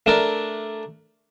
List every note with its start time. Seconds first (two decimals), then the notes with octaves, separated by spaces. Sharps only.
0.06 A3 D4 A#4 D5